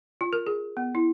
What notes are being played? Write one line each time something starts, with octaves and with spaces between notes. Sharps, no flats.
F4
A#4
G#4
B3
E4